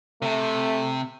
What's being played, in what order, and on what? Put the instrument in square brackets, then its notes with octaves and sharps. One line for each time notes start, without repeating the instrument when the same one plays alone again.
[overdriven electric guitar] C3 [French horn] A3